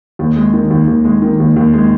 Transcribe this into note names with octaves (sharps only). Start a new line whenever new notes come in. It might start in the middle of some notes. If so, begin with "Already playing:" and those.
D#2
G#3
D#3
D#2
D#2
G#3
D#3
D#2
D#2
G#3